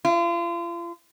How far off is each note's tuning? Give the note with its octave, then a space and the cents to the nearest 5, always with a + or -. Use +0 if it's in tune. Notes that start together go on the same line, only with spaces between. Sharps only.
F4 -35